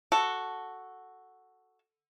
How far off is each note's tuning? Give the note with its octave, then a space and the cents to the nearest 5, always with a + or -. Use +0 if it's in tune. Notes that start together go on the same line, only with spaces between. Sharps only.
F#4 +0 A4 +0